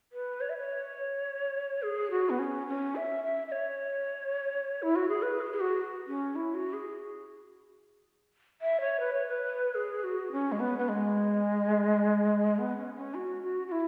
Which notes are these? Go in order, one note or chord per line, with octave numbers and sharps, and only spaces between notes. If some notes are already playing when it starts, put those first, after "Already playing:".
B4
C#5
E5
C#5
G#4
F#4
B3
C#4
C#4
E5
E5
E5
C#5
E4
F#4
G#4
B4
G#4
G#4
F#4
C#4
E4
F#4
G#4
E5
C#5
B4
C#5
B4
G#4
F#4
C#4
G#3
B3
B3
G#3
B3
C#4
C#4
F#4
F#4
F#4
E4